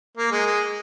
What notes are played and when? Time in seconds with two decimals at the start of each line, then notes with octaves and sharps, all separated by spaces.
0.18 A#3
0.32 G#3
0.46 G#3